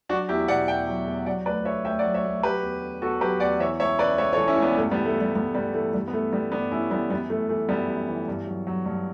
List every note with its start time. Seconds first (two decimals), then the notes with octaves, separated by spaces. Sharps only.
0.09 F#3 D4 F#4
0.29 E2 E4 G4
0.48 B2 D5 F#5
0.68 E2 E5 G5
0.87 F#3
1.07 E2
1.26 F#3 D5 F#5
1.46 D2 B4 D5
1.65 D3 C#5 E5
1.85 D2 E5 G5
1.99 D5 F#5
2.04 F#3
2.14 C#5 E5
2.24 D2
2.43 F#3 G4 B4
2.63 E2
2.83 D3
3.02 E2 F#4 A4
3.21 F#3 G4 B4
3.40 E2 D5 F#5
3.60 E3 C#5 E5
3.80 C#2 C#5 E5
3.99 C#3 B4 D5
4.18 C#2 C#5 E5
4.33 A4 C#5
4.38 E3
4.48 C#4 E4
4.57 C#2
4.62 B3 D4
4.77 G2 A3 C#4
4.91 G3 B3
4.96 E3
5.06 A3
5.16 E3 G3
5.35 G2 G3 B3
5.55 G2 G3 B3
5.74 E3 A3
5.93 G2 G3
6.08 B3
6.14 E3 A3
6.32 E3 G3 B3
6.52 G2 B3 D4
6.72 G2 C#4 E4
6.91 E3 G3 B3
7.10 F#2 G3 B3
7.30 E3 A3
7.49 E3 A3
7.69 F#2 G3 B3
7.89 F#2
8.08 E3
8.28 G2
8.47 F#3
8.67 F#3
8.86 G2